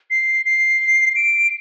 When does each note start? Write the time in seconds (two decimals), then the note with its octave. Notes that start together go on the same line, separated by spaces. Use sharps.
0.11 C7
0.46 C7
1.16 D7